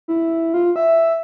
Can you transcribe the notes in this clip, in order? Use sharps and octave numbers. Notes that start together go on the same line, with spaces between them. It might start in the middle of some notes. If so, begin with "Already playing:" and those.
E4
F4
E5